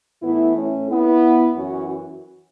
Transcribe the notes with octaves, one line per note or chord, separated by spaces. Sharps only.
A2 E3 B3 E4
A3 C#4
B3 E4
F#2 E3 C#4 F#4